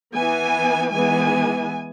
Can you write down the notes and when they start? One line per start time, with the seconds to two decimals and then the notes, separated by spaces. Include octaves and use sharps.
0.14 E3 B3 G#5
0.91 E3 G#3 B3 G#5